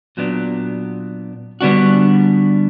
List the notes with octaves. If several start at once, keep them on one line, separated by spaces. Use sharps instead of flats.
A#2 F#3 B3 D4
D3 G3 B3 D4 F#4